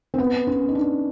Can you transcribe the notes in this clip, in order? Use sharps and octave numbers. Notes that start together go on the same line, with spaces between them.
C4
B3
C#4
D#4
D4